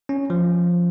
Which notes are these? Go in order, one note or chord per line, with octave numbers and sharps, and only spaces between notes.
C#4
F3